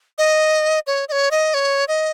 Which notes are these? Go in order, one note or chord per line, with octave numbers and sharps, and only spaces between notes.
D#5
C#5
D#5
C#5
D#5
C#5
D#5